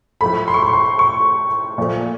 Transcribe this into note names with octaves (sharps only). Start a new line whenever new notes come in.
A2 F3 A3 B5
C6
C#6
C6
C6
C#6
A#2 F3 A3